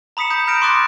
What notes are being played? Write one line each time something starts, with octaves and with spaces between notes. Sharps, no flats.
A#5 B5 D#6 B6 C#7 E7
A#5 D#6 G6 C#7
A#5 F6 G6 A#6 D7 E7
C6 D6 D#6 F#6 A6